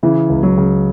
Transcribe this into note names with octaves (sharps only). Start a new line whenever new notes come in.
C#3 E3
C#2
F#3
C#3